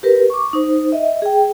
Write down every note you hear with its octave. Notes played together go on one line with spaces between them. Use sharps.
G4 A#4 B4
C#6 D6
D#4 C5
D#5 E5
G#4 G5